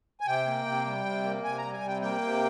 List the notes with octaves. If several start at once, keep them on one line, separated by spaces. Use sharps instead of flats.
G#5
C3 G5
A#3
C3
G3
C3
A#3
C3 G#5
G3 A#5
G#5
C3 G5
A#3 G5
C3